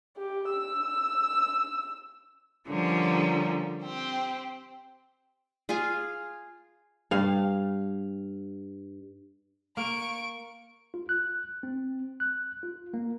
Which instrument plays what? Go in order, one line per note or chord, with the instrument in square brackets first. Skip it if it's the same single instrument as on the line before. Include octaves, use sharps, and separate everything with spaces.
[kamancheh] G4
E6
[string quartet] D3 F3 G3 A#3 C#4
C4 G4
[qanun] F4 G#4 F5 G#5
[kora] G2 F5
[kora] A#3 [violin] C#6 D7
[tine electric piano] F4
F#6
C4
F#6
F4
A#3